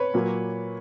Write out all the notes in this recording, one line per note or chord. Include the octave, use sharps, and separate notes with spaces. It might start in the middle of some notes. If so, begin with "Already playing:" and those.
Already playing: B4 C#5
A#2 F#3 A#3